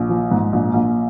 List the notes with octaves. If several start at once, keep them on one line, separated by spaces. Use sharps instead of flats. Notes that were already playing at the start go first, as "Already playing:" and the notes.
Already playing: A#1
F3
G#2
A#1
A#1